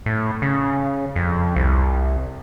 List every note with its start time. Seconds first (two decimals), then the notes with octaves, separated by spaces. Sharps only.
0.06 A2
0.42 C#3
1.16 F2
1.56 C2